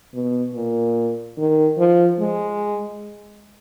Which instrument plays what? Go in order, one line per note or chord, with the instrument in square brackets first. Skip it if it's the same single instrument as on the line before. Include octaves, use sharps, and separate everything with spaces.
[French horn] B2
A#2
D#3
F3
G#3